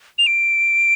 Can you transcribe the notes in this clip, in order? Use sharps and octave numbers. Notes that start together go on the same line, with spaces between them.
F7
D7